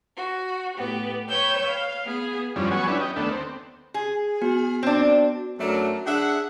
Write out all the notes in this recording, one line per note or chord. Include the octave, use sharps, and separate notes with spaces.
F#4
A2 B3 G4
B4 C#5 G5 E6 G6
F5
B3 G#4
E2 G2 F3 G3 C#4
F#3 B3 F#5 G#5 C#6
C#4 D4 E4 G4 B4
D#5 G5
D#2 A3 B3 D4
C4
G#4
B3 F#4
C4 D4
F#2 F#3 A3 D4 A#4
D4 G#4 E5 F#5